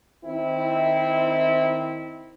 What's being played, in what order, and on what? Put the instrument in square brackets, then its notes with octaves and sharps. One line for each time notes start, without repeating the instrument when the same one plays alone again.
[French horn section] D#3 C4 E4